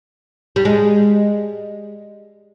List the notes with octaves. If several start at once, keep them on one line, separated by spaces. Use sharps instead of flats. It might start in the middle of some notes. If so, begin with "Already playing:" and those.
G3
G#3